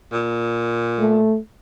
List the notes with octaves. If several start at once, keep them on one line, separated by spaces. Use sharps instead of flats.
A#2
A3